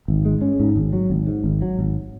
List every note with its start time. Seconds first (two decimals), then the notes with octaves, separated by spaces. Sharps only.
0.08 G#1
0.25 G#3
0.41 C#4
0.60 G#2
0.76 G#1
0.93 F#3
1.10 G#1
1.27 G#2
1.44 G#1
1.62 F#3
1.79 G#1